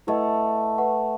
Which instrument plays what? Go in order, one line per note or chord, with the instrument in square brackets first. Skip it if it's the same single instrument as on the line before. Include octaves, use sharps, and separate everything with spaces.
[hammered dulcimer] A3 [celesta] E4 B4 D#5 F#5
[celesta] B4 F#5 C#6